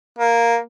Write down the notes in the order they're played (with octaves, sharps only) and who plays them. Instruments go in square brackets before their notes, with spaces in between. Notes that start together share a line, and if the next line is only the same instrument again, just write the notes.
[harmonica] A#3